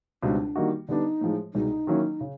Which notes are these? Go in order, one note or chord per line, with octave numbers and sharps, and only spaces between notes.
C#2 B2 G3 C4 D4 D#4
D#3 G3 A#3 D#4 F#4
D3 G3 B3 D4 D#4
A2 F3 G#3
C2 B2 G#3 D#4
D#3 F#3 A#3 C#4 E4
C#3